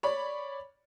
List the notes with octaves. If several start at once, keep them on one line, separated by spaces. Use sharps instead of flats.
C#5 D5 B5